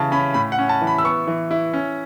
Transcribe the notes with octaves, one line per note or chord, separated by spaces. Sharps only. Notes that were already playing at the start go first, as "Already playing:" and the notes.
Already playing: C#3 E3 A5
C#4 B5
A2 B5
F#5
C#4
A5
E3
B5
E6
B3 C#6
E3
E4
C#4